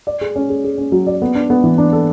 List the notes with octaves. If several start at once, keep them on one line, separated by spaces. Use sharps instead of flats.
D5
G#4
C#4
G#4
G#4
C#4
F#3
D5
B3
D4
B3
E3
D4
A4